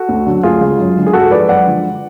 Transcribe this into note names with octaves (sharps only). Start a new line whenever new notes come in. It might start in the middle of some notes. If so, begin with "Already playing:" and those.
Already playing: F#4 A4
D2
D3 F#3
D2 F4 G#4
C#3 G#3
F#2
D3 G#3
G#4
G#2 F#4 A4
F3 G#3 B4 D5
F#2 D5 F#5
D3 F3 G#3